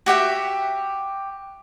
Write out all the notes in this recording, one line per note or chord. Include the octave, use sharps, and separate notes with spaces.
F#4 G4 E5 G5